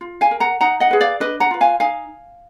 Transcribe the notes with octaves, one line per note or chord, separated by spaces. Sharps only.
F4
F5 G#5
A#4
F#5 A#5
D#4 F#5 A#5
D#5 F#5
G#4 B4
D5 F5
D4 B4 D#5
F#5 A#5
F4 B4
F5 G#5
D#4 F5 G#5